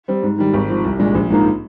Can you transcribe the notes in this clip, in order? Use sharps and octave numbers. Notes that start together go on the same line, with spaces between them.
G3 C4
G#2
D#3 G3
G#1
G#2 F3
C2
A#2 G#3 D4
A#1
G#2 F3 A#3 D#4